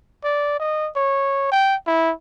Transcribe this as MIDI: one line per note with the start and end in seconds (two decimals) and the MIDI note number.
0.24 0.57 74
0.59 0.89 75
0.96 1.49 73
1.52 1.76 79
1.87 2.12 64